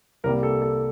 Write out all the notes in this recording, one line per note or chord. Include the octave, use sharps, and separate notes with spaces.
C2 C3 G3 A#3 A#4
A4
A4